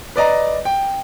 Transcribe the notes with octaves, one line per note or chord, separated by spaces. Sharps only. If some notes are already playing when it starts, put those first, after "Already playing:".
B4 D5 D#5 A#5
G5